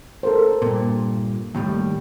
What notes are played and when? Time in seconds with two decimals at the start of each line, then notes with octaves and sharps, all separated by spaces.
0.23 A4 A#4 C5
0.62 G2 A#2
1.55 D#2 A2 G3